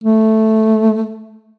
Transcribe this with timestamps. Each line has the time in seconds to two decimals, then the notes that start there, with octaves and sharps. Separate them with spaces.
0.04 A3